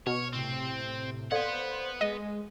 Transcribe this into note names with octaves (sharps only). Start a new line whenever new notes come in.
B2 C#5 C#6 F6
A2 C3 C4
A4 B4 C5 D5 F5 F#5
G#3 D#5